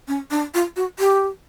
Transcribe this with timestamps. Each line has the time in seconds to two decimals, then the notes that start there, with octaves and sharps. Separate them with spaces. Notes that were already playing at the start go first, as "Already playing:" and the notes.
0.08 C#4
0.31 D4
0.54 F4
0.76 F#4
0.99 G4